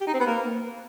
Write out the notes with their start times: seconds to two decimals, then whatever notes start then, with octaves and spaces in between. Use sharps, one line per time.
0.01 G4
0.07 D#4
0.14 C4
0.20 B3
0.27 A#3